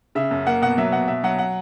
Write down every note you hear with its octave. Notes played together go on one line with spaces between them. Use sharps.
C#3 E5
F#2
A#3 F#5
B2 F#5
F#3 E5
B2 F#5
B2 E5
F#3 F#5
F#5